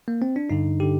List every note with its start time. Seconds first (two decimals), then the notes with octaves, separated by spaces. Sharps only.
0.08 A#3
0.22 C4
0.36 D4
0.50 G2 D3 D#4
0.80 D3 G4